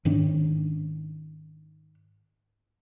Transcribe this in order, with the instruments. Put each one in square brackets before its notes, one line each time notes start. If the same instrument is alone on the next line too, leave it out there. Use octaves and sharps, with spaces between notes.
[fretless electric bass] G#2 D#3 C#4 D4